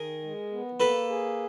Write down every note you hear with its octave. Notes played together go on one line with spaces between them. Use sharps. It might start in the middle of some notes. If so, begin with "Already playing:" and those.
Already playing: D#3 G#4 A#4
G#3
B3
A#3 A4 B4
G#4